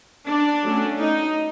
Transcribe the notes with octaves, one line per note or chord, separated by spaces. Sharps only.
D4
F#3 A3 C#4
D#4